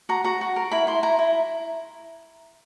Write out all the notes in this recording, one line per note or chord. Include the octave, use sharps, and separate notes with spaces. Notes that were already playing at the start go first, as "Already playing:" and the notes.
F#4 A#5
F#4 A#5
F#4
A#4
E4 B5
E4 C6
E4 A#5
E4